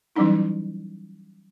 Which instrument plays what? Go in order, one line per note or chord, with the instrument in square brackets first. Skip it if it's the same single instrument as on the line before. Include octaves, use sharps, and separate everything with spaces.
[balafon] E3 F#3 G3 C#4 D#4 E4